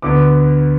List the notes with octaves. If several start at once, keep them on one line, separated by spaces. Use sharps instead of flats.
D2 D3 B3 D6